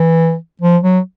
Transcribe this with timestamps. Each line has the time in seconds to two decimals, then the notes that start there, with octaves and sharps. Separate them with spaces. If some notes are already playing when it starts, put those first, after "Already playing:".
Already playing: E3
0.62 F3
0.83 F#3